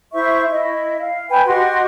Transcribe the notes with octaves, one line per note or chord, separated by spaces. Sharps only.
E4 C5 E5 C#6
E4 D#5
F5
B4 G5 G#5 B5
F#4 G4 D#5 C6